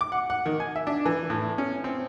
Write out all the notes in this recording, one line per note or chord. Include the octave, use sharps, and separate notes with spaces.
D6
F#5
F#5
D#3
G#5
E5
D4
E3
A2
C#4
C4